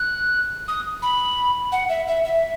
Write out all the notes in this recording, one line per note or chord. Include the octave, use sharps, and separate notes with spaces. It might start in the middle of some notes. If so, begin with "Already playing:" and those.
Already playing: F#6
D#6
B5
F#5
E5
E5
E5